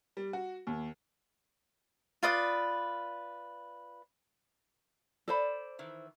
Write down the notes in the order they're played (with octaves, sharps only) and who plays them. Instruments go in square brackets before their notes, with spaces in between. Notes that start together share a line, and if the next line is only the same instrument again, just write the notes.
[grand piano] G3
F#4
D#2
[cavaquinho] F4 B4 D5 D#6
[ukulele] A4 C5 B5 [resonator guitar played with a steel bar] D5
[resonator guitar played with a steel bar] D#3 E3 E4